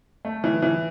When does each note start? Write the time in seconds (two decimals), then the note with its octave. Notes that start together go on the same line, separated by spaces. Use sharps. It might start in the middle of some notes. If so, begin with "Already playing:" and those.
0.25 A3
0.44 E3
0.62 E3